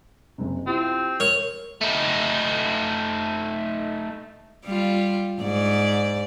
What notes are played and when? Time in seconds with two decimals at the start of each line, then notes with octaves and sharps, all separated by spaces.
0.38 F#1 C3
0.67 C4 E4 F4 G4
1.20 A#4 C#5 F6
1.81 A3 D#4
4.65 G3 F4
5.41 G#2 D5